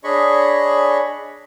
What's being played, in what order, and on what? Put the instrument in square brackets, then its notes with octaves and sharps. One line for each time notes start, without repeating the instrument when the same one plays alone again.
[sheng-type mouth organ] D4 G#4 C#5 D#5 B5 C#6